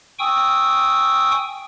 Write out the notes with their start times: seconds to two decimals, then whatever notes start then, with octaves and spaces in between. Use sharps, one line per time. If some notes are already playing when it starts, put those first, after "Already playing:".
0.19 G5 G#5 C#6 D#6 E6